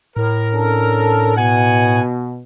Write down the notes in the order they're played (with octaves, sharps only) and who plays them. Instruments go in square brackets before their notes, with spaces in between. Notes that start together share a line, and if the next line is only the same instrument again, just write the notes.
[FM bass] A2 [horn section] A#4
[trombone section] C#4 D4 A4
[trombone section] B2 [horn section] F#5 G#5